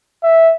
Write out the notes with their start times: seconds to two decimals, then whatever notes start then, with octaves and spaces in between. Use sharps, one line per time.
0.23 E5